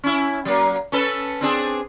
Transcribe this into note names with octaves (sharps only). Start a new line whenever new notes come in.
C#4 E4
F#3 A#3
C#4 A4 B4
C4 D4 G#4